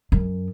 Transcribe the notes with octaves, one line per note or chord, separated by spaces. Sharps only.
F#2